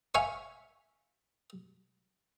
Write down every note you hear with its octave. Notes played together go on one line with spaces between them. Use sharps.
E5 F5 G#5 C#6